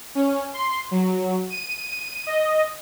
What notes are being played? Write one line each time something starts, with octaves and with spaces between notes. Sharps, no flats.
C#4
C6
F#3
D#7
D#5